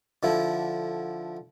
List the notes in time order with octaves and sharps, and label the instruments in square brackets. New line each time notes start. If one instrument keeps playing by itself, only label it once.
[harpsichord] D3 F3 E4